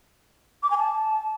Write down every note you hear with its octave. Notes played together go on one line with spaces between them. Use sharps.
D6
G#5
A5